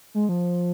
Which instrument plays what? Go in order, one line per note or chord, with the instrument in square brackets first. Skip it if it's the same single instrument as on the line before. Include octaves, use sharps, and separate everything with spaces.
[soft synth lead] G#3
F3